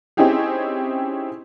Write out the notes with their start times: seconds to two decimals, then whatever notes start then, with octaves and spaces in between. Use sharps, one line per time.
0.17 C4 C#4 D#4 E4 G4 G#4